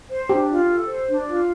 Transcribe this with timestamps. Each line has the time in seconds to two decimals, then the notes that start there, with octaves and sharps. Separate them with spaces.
0.10 C5
0.29 D4 G4
0.49 F4
0.69 A4
0.88 C5
1.08 D4
1.27 F4